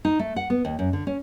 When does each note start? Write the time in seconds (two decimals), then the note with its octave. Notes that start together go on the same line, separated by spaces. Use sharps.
0.05 D#4
0.19 A3
0.36 F#5
0.50 B3
0.65 D#2
0.79 F#2
0.93 D3
1.07 C#4